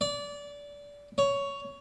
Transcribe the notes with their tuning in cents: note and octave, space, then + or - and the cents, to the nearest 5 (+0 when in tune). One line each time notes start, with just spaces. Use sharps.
D5 -25
C#5 +10